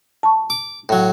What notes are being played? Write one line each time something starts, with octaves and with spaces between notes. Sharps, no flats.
A5 C#6
D6
A2 F#3